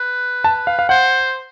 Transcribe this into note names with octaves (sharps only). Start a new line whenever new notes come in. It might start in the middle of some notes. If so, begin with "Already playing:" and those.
Already playing: B4
A5
F5
F5
C5 F#5